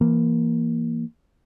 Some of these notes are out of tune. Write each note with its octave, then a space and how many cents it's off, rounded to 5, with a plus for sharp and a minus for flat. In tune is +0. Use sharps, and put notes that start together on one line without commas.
E3 +20 A#3 +0